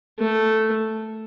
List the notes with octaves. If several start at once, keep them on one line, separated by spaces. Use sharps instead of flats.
A3